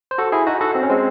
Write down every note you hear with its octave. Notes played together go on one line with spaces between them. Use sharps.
C5
F#4 A4
E4 G#4
D#4 F#4
F#4 A4
C4
C#4
G#3 C4